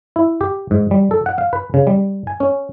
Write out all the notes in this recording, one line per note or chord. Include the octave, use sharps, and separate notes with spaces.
E4
G4
G#2
G3
A4
F#5
F5
B4
C#3
G3
G#5
C#4